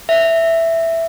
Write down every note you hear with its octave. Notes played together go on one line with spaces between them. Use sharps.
E5